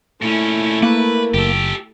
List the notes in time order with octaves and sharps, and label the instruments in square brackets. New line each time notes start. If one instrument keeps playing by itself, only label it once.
[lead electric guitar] A#2 C#4 [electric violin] A3 E4
[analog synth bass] A#3 [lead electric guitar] B4
[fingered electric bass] F#1 [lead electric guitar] G4 A4